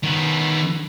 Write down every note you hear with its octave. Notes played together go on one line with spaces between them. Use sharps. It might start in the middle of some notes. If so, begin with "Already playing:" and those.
D#3 B3